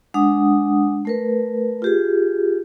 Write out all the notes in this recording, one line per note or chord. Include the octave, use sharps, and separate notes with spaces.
G#3 D4 F#5 D#6
A3 A#4 B4
F4 G4 G#4